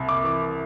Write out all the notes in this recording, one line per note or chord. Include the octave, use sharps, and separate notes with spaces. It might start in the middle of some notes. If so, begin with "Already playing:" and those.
Already playing: C2 C3
D6
E3 D6